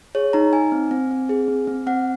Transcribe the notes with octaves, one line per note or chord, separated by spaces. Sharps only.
G#4 C#5
D#4 A#5
D#4 G#5
C4
C4
C4
G#4
C4
C4
C4 F#5